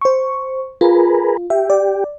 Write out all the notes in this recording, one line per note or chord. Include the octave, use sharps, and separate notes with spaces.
C5 C#6
F4 G#4 A#4 B4
G4 E5
D5